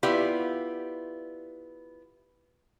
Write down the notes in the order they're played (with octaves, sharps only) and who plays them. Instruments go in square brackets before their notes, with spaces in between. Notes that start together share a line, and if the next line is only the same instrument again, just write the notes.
[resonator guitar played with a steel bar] B3 E4 F4 G4 D5